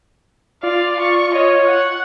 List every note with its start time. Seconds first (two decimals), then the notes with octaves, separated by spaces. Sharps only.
0.63 F4 D5 F5
1.00 C#6
1.34 C#5 D#5
1.67 F#5